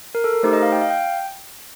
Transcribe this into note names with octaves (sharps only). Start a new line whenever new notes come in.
A#4
A4
A#4
A3 D#4 G4 C5
D#5
F5
G5
F5
G5